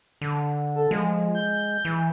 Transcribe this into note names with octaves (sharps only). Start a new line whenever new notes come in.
D3
A4
F3 G#3
G6
E3